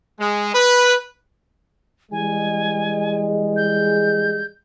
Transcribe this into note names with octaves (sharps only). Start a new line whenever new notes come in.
G#3
B4
E3 G3 G#3 G#5
G6